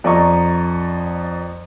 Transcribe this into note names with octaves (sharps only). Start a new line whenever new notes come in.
F2 D5 D#5 A#5 C#6